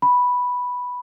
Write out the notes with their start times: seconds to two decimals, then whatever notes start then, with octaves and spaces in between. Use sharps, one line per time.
0.02 B5